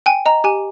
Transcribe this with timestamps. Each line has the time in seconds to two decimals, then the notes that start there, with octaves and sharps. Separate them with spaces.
0.06 G5 G#5
0.26 D#5 A#5
0.44 G4 G#5